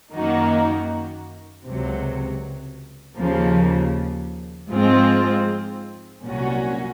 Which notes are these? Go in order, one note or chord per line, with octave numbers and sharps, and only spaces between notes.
F#2 D#3 A#3 D#4 F#4
C#2 C3 F#3
D#2 C#3 F3 A#3
G#2 F3 G#3 C4 F4
C2 A#2 F#3 C#4 F#4